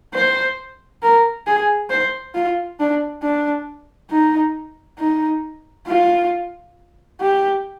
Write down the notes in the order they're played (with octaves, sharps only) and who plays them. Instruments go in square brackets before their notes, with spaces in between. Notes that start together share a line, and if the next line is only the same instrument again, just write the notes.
[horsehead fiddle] C5
A#4
G#4
C5
F4
D4
D4
D#4
D#4
F4
G4